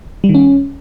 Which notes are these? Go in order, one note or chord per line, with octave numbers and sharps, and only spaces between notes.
G3
D#3
C#4